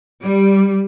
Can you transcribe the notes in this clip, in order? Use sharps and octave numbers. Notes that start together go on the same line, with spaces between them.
G3